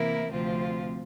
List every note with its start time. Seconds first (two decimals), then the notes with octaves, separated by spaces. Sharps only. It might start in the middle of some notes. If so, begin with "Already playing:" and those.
Already playing: C3 E3 A#3 E4 A#4
0.30 D2 C3 F3 C4 F4